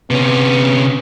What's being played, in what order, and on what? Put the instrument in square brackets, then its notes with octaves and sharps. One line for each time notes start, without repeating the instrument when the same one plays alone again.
[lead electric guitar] C3 C#4 [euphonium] B3